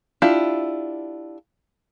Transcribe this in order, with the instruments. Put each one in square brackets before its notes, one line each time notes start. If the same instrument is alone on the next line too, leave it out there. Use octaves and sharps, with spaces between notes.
[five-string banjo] D4 E4 F4 G4